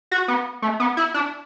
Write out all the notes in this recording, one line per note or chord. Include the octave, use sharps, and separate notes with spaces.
F#4
B3
A3
B3
E4
D4